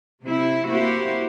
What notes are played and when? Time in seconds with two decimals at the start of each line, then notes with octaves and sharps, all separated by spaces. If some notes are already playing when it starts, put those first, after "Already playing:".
0.23 C3 C4 E4
0.67 A#3 E4 F#4 G4 C5